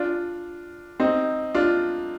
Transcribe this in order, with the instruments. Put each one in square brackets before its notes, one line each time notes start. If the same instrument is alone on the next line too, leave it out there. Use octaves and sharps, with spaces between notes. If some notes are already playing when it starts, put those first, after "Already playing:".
Already playing: [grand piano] D4 F4
C4 D#4
D4 F4